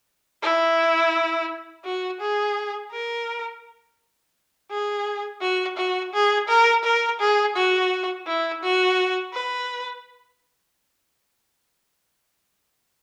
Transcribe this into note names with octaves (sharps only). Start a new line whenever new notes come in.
E4
F#4
G#4
A#4
G#4
F#4
F#4
G#4
A#4
A#4
G#4
F#4
E4
F#4
B4